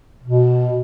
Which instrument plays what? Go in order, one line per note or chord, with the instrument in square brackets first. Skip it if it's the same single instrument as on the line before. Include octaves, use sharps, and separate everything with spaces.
[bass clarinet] B2